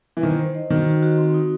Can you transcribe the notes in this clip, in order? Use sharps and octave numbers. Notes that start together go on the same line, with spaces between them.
E3
D#3 C5
C5
D#5
D#3 F#4
F#4
F#4
C4
D#4